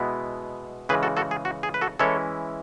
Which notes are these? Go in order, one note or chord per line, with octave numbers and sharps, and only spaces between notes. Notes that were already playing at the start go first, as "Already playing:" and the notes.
Already playing: B2 G#3 B3 E4
C#3 E3 G#3 G#4 B4
F#4 A4
F#4 A4
G#4
F#4
G#4
B4
F#4 A4
E3 G#3 C#4 E4 A4 C#5